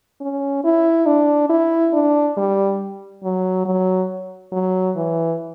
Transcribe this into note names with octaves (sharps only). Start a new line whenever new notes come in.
C#4
E4
D4
E4
D4
G3
F#3
F#3
F#3
E3